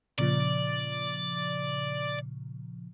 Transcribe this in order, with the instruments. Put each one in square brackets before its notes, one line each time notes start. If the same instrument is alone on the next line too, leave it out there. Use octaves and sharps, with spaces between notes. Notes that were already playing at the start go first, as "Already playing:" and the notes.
[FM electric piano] A#2 C#3 F3 [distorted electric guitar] D5